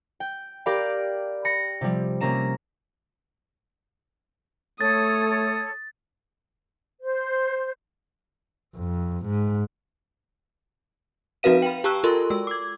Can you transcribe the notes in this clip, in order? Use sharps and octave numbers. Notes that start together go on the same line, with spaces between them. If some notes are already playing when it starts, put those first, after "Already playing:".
G5
G4 A#4 D5 F5 B5 D6
B5 A#6 C#7
C3 F3 G3
C3 A#3 C#4 A#5 E7
A3 A4 C#5 D#6 A6
C5
F2
G#2
F3 C4 F#4 B4 F5 D#7
G5 B5
G4 A5 A#5 C#6 E6 F#6
F4 A4 A#4 C6
G#3 E6
D6 G#6